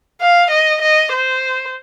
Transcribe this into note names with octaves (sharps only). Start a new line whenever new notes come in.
F5
D#5
D#5
C5